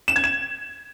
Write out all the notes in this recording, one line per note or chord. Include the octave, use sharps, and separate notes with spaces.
E7
G#6
E7